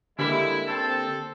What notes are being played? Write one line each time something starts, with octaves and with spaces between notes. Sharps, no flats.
D3 G3 G#3 A#3 E4
C4 A4